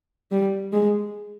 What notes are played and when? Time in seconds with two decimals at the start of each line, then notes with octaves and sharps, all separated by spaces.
0.31 G3
0.73 G#3